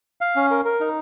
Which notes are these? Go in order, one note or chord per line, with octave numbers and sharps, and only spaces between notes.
F5
C#4
A#4
A#4
D#4